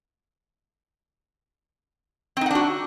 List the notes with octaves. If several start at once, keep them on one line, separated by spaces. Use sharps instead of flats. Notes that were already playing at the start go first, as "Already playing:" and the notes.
C4 D4 D#4 F#4 F#5